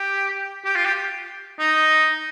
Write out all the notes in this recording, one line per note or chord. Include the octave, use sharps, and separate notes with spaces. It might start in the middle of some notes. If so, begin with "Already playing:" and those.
Already playing: G4
G4
F4
G4
D#4